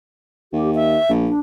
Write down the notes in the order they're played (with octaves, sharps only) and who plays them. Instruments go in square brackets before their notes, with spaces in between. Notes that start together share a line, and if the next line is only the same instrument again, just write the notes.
[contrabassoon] D#2 [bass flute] G4
[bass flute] E5
[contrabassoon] A#1
[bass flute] D4